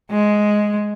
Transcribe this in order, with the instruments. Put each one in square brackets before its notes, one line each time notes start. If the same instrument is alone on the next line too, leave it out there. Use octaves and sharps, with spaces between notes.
[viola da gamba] G#3